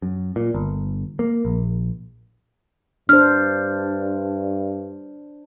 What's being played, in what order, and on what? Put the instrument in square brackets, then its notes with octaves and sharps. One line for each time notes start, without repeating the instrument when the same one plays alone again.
[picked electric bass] F#2
A#2
G1
A#3
A#1
[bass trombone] G2 [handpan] D4 C5 [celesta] F6